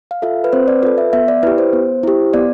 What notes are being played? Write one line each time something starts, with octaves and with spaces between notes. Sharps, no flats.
F5
F4 A4 E5
B4
C4 C5
D5
F4 A4 B4
E5
B3 E5
D5
E4 G4 B4
C5
B3
E4 G4
B3 D5